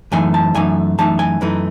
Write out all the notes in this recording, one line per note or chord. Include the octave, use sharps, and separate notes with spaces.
F#2 E3 A3 D#4 G#5
A5
F#2 E3 A3 D#4 G#5
F#2 E3 A3 D#4 A5
G#5
F#2 E3 A3 D#4